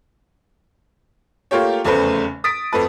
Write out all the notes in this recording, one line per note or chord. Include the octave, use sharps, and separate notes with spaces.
A3 A#3 F4 G4 C#5
F1 E2 C#3 A3 B4 C5
D#6 A6 B6 D7
F2 A3 B4